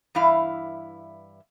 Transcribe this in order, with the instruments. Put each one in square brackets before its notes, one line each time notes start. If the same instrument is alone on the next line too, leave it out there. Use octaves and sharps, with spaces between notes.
[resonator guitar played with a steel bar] G2 E3 E4 F5